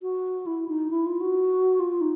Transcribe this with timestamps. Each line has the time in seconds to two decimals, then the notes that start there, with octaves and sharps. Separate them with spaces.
0.02 F#4
0.46 E4
0.69 D#4
0.91 E4
1.06 F4
1.21 F#4
1.80 F4
2.01 D#4